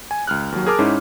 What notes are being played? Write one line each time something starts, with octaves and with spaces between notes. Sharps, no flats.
G#5
C#2 F6 F#6
D#2 F#3
G#4 A#4 A5 D6 F6
G#2 C#4 D#4 E4